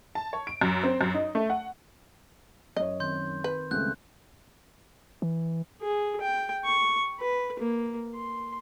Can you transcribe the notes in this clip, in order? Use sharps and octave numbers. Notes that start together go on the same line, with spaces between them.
A5
C#5
D7
F#2
C4
F#2
D#4
A3
F#5
F#2 C#5 D#5
D#3 C4 C6 G6
B4
C#2 G3 A3 C4 F#6 G6
E3
G#4
G5
C#6
B4
A#3
C6